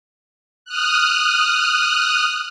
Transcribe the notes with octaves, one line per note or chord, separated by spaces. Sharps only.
D#6 F6 F#6